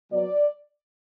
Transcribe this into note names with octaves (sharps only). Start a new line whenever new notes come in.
B2 F#3 D5